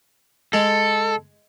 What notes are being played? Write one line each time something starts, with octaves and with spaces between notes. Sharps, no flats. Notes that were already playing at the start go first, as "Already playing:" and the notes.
G#3 A4